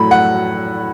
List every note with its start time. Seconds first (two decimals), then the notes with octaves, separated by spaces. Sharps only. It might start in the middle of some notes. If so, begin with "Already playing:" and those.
Already playing: A2 F#3 A3 B5
0.11 F#5